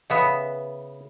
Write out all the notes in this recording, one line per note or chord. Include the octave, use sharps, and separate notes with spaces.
C#3 B3 B4 D#5 E5